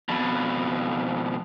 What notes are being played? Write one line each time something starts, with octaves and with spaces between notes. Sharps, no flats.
F2 B2